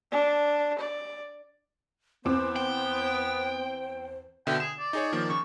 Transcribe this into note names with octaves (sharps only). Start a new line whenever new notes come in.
D4
D5
E2 B3 C4 C5 D6
G5
B2 D3 E5 G5
G#4 E7
D5
D#4 G#4 C#5
D#3 F3 A#3
C#3 C#6